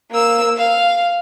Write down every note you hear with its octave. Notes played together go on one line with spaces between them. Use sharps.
A#3 E6
F5